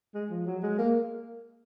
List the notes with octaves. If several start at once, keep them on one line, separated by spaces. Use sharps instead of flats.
G#3
F3
F#3
G#3
A#3